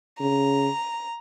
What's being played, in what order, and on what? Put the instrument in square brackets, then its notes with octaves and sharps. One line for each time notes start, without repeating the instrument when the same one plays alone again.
[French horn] C#3 [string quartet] A#5